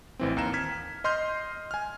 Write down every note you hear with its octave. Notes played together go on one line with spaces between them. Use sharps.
A1 E3 C4
D#2 A#5 E7
F6 G#6 B6
D#5 C6 F6 G6 C7
G#5 F6